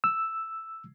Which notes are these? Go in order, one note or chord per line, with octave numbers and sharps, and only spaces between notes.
E6